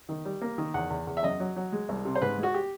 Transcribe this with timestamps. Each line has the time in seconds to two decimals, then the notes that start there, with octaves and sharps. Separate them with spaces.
0.09 D#3
0.25 G3
0.41 A#3
0.58 D#3
0.74 E2 F#5
0.90 E2
1.07 E2
1.17 E5
1.23 F#2 D#5
1.40 F#3
1.56 F#3
1.72 G#3
1.89 C2
2.05 C3
2.15 C5
2.22 G#2 B4
2.38 G#3
2.43 F#4
2.54 G4